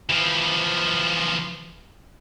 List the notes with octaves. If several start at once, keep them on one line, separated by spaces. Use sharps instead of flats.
E3 F3